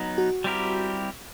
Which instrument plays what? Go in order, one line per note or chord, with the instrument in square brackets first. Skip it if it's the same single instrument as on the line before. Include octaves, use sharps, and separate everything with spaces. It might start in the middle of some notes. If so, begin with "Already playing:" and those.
Already playing: [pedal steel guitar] F#3 B3 D#4
[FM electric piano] F#4
[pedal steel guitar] G3 C4 E4 G4 A#4